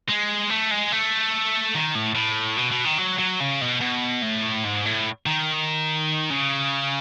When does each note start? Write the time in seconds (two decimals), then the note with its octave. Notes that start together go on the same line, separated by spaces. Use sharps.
0.09 G#3
0.50 A3
0.71 G#3
0.92 A3
1.75 D#3
1.95 A2
2.15 A2
2.57 B2
2.71 B2
2.85 D#3
2.98 F#3
3.19 F#3
3.40 C#3
3.61 B2
3.81 B2
4.22 A2
4.65 G#2
4.86 A2
5.26 D#3
6.30 C#3